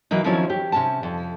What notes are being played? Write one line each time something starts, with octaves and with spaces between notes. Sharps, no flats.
E3 F#3 A#3 D#4
D#3 F3 F#3 C4 C#4 E4
G4
C3 C#4 A5
F2